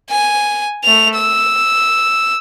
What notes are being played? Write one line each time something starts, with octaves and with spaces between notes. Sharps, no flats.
G#5
A3 F7
E6